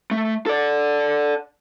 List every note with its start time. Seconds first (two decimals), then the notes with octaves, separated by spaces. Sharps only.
0.11 A3
0.46 A4 D5